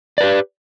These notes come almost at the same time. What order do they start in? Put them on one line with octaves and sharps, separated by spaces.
D5 B4 G4